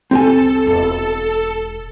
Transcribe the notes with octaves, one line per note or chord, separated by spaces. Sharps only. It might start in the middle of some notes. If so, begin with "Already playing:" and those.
F1 C2 C4 G4 A4 G#5
E1